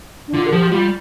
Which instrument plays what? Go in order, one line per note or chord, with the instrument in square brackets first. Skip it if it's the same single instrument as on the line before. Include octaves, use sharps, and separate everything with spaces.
[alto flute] D4
[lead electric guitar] D3 [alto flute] F4
[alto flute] A#4
[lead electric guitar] F3 [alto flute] G4
[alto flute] G4
[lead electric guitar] G3 [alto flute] F4